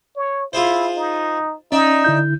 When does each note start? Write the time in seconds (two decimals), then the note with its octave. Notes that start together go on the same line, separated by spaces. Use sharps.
0.16 C#5
0.53 E4 F4 G#4 C5
0.96 D#4
1.72 C#4 D#4 D5 E5
2.04 D3 E4 G6